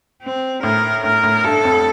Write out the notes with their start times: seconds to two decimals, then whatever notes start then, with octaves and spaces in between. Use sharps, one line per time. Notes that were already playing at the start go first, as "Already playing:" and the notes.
0.23 C4
0.63 A2 A#4
1.04 A2 A#4
1.23 A2
1.44 G2 A4
1.65 F2